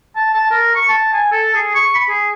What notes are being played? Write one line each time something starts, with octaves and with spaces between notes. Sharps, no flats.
A5
A5
A#4
C#6
A5
G#5
A4
G#4
C#6
B5
G#4